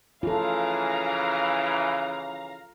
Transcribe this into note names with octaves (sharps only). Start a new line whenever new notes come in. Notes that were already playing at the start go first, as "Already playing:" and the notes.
C#3 E3 F4 A4 F5 A#5